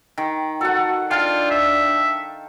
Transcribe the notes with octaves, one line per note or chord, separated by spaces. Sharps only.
D#3
F#4 A4 F#5
D4 F4 F5 G5 A5
E5